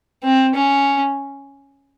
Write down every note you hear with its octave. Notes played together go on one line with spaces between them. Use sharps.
C4
C#4